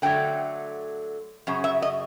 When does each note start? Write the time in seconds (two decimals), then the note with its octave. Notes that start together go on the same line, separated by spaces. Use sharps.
0.02 D3 F#3 A3 G5
1.47 F#2 C#3
1.64 E5
1.82 D#5